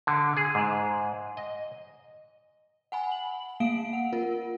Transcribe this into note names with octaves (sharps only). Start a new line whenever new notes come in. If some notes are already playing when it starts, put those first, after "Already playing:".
D3
G#4
G#2
D#5
F#5 G#5 B5
F#7
A#3 F5 D7
F#5
F4 A#4